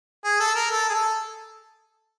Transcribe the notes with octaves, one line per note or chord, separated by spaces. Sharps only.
G#4
A4
A#4
A4
G#4
A4